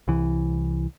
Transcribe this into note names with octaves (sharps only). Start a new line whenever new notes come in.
C2 E3